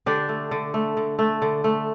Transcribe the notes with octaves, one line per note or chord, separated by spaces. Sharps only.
D3 D4 G4
A3
D3
A3
D3
A3
D3
A3